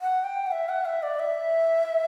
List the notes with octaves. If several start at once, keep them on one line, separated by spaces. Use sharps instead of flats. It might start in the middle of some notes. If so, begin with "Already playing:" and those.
F#5
G5
F#5
E5
F#5
E5
D5
E5